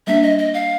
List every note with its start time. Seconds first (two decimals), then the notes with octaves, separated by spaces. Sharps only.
0.07 G3 A#3 D4 E5
0.23 D#5
0.38 D#5
0.54 F5